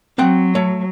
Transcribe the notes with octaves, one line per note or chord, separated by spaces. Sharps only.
F#3 C4 F#5 G5
A3 C#5